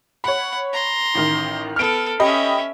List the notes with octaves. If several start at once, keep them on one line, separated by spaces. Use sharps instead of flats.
C#5 F#5 B5
A#5 C6
A1 D#3
B3 A4 F6 D7
C#4 G4 D#5 E5 B5